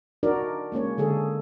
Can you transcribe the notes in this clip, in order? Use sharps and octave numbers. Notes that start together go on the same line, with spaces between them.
D4 D#4 F#4 A#4 D5
G#3 A#3 C#4 C#5
D3 G#3 G#4 A4